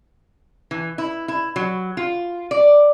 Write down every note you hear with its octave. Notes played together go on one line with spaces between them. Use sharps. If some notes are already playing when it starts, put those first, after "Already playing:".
E3
E4
E4
F#3
F4
D5